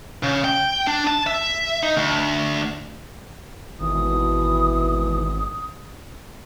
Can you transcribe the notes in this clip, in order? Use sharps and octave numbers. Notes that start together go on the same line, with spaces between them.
C#3
G5
D4
A5
E5
D#4
D2
G#1 B2 E3 D#6